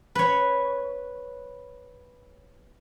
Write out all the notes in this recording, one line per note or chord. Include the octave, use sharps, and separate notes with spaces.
B4 C#5